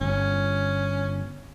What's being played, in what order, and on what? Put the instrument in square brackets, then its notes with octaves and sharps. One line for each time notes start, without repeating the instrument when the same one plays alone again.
[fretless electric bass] G1 [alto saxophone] C#4